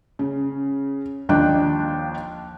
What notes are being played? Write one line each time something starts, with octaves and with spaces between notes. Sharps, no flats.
C#3
D#2 D#3 F3 D4 G5 F#6